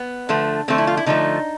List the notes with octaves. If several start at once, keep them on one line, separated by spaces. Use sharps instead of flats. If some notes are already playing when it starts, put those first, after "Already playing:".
Already playing: B3
D3 F3 A3
D3 F3 A3 C4
E4
F4
E4
D3 F3 A3 D#4